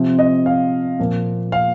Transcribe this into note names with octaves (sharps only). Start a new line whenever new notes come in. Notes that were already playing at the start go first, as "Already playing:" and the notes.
Already playing: C3 F3 C4
D#5
F5
A#2 F3 A#3
F5